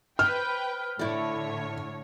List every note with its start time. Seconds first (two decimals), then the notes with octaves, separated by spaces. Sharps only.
0.19 B4 C5 G5 F6
0.99 A2 D3 E4 C#5 D5